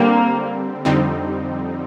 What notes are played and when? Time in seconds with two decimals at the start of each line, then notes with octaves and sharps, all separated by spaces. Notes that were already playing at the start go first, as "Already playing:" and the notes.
Already playing: D3 G3 A#3 C4
0.85 F2 D3 G3 C4 D#4